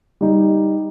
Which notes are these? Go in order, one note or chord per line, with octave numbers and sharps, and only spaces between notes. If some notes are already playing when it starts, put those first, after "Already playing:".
G3 D#4